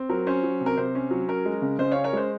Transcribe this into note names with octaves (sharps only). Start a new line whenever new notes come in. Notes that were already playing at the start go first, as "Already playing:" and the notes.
Already playing: C4
F#3 A#4
C#4 C5
F#3
C3
A#4
C3 C5
C#4
F#3
C#4 A#4
G#3
C#3
C#3 C5 D#5
C#4 C#5 F5
A#4 C#5
G#3 C5